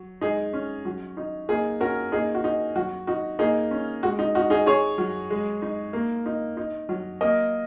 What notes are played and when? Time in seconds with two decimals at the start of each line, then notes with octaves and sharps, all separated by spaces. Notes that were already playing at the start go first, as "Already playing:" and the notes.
Already playing: F#3
0.21 G#3 D#4 G#4
0.53 C#4
0.85 F#3
1.17 D#4
1.48 A#3 D#4 G#4
1.81 C#4 F#4 A#4
2.12 A#3 D#4 G#4
2.35 F#4
2.44 D#4
2.76 F#3 F#4
3.07 D#4 F#4
3.39 A#3 D#4 G#4
3.71 C#4
4.03 G#3 F#4
4.19 D#4
4.35 D#4 F#4
4.50 D#4 G#4
4.66 D#4 G#4 C#5
4.98 F#3
5.31 G#3
5.62 D#4
5.93 A#3
6.26 D#4
6.57 D#4
6.89 F#3
7.21 A#3 A#4 D#5